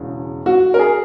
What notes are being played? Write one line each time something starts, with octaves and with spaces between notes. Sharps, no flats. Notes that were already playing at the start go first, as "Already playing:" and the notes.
Already playing: E1 E2 C#3
F#4
A#4
G#4